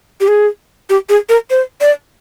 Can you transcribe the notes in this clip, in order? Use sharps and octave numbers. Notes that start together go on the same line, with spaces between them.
G4
G#4
G4
G#4
A#4
C5
D5